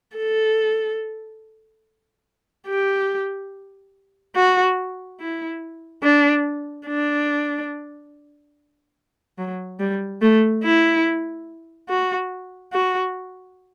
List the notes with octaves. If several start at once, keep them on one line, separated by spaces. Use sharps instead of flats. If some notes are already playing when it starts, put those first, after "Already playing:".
A4
G4
F#4
E4
D4
D4
F#3
G3
A3
E4
F#4
F#4